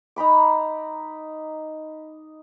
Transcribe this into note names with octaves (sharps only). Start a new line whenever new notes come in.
D#4 A#5 B5 D6